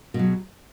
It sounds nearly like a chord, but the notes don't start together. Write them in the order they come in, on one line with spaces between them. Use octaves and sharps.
B2 G#3 F#3